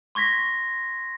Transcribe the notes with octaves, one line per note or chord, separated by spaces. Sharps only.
C6 C#6 G#6 A#6 B6